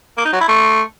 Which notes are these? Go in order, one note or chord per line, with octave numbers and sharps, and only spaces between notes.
A#3
D#4
F#3
E4
A3